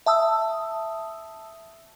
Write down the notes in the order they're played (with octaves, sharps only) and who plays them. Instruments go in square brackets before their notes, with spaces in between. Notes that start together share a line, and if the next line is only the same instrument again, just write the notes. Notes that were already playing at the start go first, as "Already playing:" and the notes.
[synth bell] E5 A5 D#6 E6